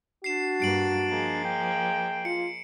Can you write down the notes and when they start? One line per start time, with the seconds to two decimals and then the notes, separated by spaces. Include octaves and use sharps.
0.24 D4 F#4 C7 E7
0.60 G2 A#3 C7 D7 F#7
1.07 F3 G#3 A#3
1.44 G5
2.25 F4 C#7